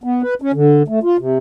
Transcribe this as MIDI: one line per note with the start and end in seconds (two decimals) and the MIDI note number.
0.04 0.22 59
0.22 0.34 71
0.42 0.52 61
0.53 0.83 50
0.88 0.99 57
1.03 1.17 65
1.18 1.38 48